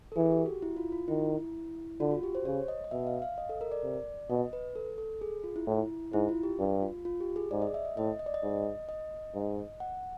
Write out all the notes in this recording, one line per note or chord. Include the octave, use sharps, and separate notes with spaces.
A4
E3 G#4
G4
F#4
E4
F4
F4
D#3 E4
D3 F4
F#4
G4
C5
C#3 C#5
D#5
D#5
B2 E5
F5
F5
D#5
A4
A#4
D5
C3
B2 D#5
B4
A4
A4
G#4
F4
E4
A2
G#2 E4
F4
G4
G2
F4
F4
G4
G#4
G#2 D5
D#5
E5
D#5
A2 D#5
D#5
D5
D#5
G#2
D#5
G#2
F#5